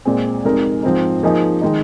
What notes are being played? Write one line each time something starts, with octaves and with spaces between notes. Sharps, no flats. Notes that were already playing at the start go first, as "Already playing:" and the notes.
A#2 G#3 C4 G#4
F2 C3 G#3 D#4 A#4
G#2 F3 C4 D#4
F3 A#3 D#4 G#4 D#5
D#3 G#3 D#4